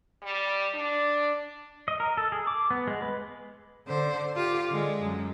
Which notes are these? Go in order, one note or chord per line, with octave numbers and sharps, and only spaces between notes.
G3
D4
D#5
A#4
A4
G#4
D6
B3
G#3
B4
D3 C5
F4 G4
D3 G#3
F#2